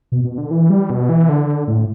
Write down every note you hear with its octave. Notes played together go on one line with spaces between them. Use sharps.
B2
B2
D3
E3
G3
B2
E3
D3
A2